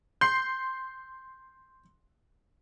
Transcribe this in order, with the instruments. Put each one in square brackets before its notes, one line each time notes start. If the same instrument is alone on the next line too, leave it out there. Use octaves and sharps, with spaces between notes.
[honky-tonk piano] C6 C7 [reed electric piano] G6